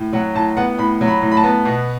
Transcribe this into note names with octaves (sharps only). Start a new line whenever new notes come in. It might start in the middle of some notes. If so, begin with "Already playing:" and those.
Already playing: A2
F#3 F#5
A2 A5
B3 F#5
A2 B5
F#3
B5
A2
B5
A5
B3
B2